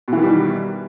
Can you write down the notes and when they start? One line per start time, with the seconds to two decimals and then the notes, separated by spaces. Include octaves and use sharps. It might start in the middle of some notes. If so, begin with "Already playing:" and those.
0.08 B2
0.12 E3
0.17 D#3
0.22 G3